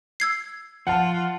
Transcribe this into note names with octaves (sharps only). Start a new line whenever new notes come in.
E6 G#6 C7
F3 F4 F#5 A5